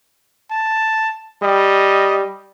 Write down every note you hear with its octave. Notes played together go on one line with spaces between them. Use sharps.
A5
G3 D#5